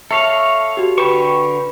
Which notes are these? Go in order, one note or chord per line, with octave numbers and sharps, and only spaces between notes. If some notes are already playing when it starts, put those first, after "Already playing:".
A4 C#5 E5 F5 C#6 C7
F#4 G4
D3 B4 G5 B5 C#6